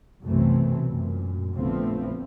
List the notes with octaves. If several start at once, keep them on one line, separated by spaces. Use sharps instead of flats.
B1 F#2 C3 E3 A3 C4
F#2 A#2
A#1 D3 F3 A3 B3 C4